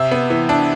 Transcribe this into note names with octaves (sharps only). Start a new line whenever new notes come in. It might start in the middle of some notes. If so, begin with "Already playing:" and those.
Already playing: C3 E5
B3
E3
D4